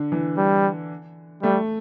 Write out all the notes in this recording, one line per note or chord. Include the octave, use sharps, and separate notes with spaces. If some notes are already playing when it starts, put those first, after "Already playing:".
Already playing: D3
E3
G3
G3 A3